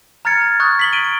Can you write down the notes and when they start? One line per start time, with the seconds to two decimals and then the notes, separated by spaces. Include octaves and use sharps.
0.25 A#5 F6 G#6 A6 C#7
0.42 A6
0.60 C#6 D#6 F#6 A6
0.79 B6 F#7 G7
0.93 D7 D#7 G7
1.04 D7